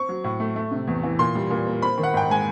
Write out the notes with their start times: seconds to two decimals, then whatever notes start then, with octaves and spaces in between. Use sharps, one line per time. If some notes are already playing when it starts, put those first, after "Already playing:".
Already playing: C4 C#6
0.09 F#3
0.24 A2
0.40 A3
0.56 A3
0.71 C3
0.87 E2
1.03 E3
1.19 A#2 C6
1.35 G3
1.50 A#2
1.67 A#3
1.82 C4 B5
1.98 D#3
2.03 F#5
2.14 G#2 G5
2.29 G#3 G#5